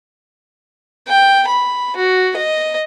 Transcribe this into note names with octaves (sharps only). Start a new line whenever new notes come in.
G5
B5
F#4
D#5